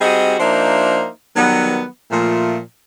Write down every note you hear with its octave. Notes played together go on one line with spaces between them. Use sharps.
G3 C4 D#4 F#4 G#4 D#5
F3 A#3 D4 D#4 C5 E5
D#3 F#3 G3 B3
A#2 F3 A3